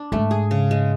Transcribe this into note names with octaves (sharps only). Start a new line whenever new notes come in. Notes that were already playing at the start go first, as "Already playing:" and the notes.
Already playing: D4
G#2 A3
G#4
C#3
G#3